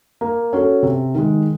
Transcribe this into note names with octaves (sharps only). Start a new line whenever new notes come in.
A#3
C#4 F#4 A4
C3
D#3 G#3